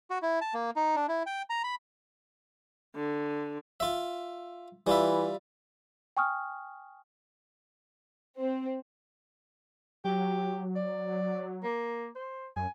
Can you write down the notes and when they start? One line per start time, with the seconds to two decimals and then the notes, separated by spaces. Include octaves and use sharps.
0.10 F#4
0.22 E4
0.41 A5
0.54 A#3
0.76 D#4
0.96 D4
1.08 E4
1.26 G5
1.50 A#5
1.64 B5
2.95 D3
3.80 F4 E5
4.87 E3 G3 F4 E5
6.17 G5 G#5 C#6 D#6 F6
8.39 C4
10.04 F#3 G4
10.76 D5
11.64 A#3
12.16 C5
12.56 F#2 G#5